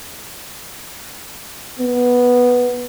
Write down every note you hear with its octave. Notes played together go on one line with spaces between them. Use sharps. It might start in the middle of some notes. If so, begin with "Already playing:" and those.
B3